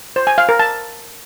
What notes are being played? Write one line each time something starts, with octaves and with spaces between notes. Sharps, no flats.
C5
G#5
F5
A#4
A5